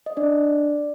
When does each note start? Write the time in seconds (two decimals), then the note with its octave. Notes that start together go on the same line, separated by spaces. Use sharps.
0.06 D#5
0.17 D4 D5